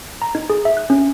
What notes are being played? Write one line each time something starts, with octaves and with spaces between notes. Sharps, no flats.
A#5
D#4
G#4
E5
F#6
C#4